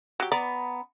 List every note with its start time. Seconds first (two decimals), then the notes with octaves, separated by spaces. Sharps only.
0.20 F#3 G4
0.32 B3 D5 A#5